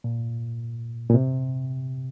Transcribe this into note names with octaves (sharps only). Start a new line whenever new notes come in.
A#2
A#2
C3